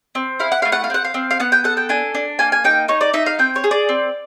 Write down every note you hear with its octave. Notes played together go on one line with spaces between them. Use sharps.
C4
E4 F5
F#5
A3 F5
F#5
F5
C4 F#5
F5
C4
F5
B3 F#5
G5
A4 F#5
G5
D4 G#5
D4
A#3 G#5
G#5
D#4 G5
D#4 C#5
D5
D#4 E5
F5
C4 G5
C#5
G#4
D5
C4